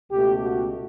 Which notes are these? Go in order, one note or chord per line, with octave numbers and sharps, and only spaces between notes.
C#2 B2 A3 G4
F#4